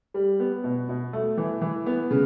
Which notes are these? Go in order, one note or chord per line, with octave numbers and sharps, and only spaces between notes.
G3
B3
B2
B2
A3
E3
E3
B3
C#3